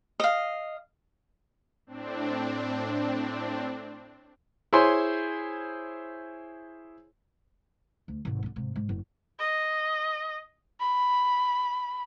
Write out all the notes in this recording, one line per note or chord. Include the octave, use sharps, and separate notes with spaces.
D#5 F5
A2 C4 D4
E4 G#4 C5 C#5 G#5 C6
D2
G#1 C3
D3 D#3
G#2 C3
G#2
F#1
D#5
B5